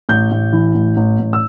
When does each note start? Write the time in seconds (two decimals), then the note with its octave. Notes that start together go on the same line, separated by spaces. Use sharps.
0.09 A1 G6
0.32 A1
0.53 E3
0.75 A1
0.97 A1
1.19 A1
1.33 E6